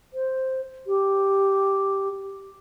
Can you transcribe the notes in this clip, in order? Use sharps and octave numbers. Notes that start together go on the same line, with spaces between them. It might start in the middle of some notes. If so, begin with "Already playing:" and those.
C5
G4